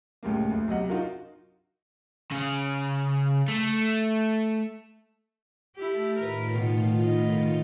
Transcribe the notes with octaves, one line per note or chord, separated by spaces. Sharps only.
C#2 A2 C3 A#3
D2
B1 C3 D#5 F#5
D#4 F4 F#4 A#4
C#3
A3
A3 E4 G4 A5
A2 D#3 F4 A#4 B4
B2
B2 D#5